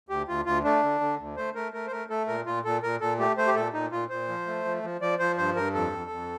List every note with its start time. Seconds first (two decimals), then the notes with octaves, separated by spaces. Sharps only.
0.09 D2 G4
0.27 D2 F4
0.45 D2 F4
0.64 A3 D4
0.82 D3
1.00 D3
1.19 D2
1.37 A3 C5
1.55 A3 A#4
1.73 A3 A#4
1.87 C5
1.91 A3 A#4
2.10 A3 A4
2.28 A#2 A#4
2.46 A#2 F4
2.65 A#2 A4
2.83 A#2 A#4
3.01 A#2 A4
3.19 A3 G4
3.37 A3 C5
3.47 G4
3.55 A#2 A4
3.73 A#2 D#4
3.92 A#2 F4
4.10 A#2 C5
4.28 F3
4.47 A3
4.65 F3
4.83 F3
5.01 F3 D5
5.19 F3 C5
5.37 G2 C5
5.56 G2 A#4
5.74 F2 A4
5.92 F2
6.10 F2